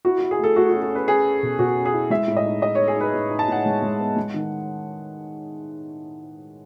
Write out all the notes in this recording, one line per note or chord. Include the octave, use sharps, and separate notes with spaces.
E4 F#4
E4 F#4
G#4
A3 A4
A3 F#4
C#4 F#4
A4
C#4
B4
C#4 G#4
C#4
B2
B2 F#4
C#4
G#4
E4
G#3 E5
A2
D#5
D#4
D#4 D#5
D#4 C#5
G#4
D#4 B4
A2
D#4
A5
A2 F#5
G#3
G#3
B3
G#3
D#3